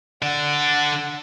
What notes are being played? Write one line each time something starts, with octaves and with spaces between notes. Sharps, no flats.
D3 D5 F#5